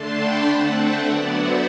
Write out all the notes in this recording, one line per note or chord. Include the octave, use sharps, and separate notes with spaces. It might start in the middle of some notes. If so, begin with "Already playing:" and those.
Already playing: D3 A3 D4 A5 C6
G5 B5
D3 A3 C4 F#5 A5
E5 G5
D3 F#3 B3 D5 F#5
C5 E5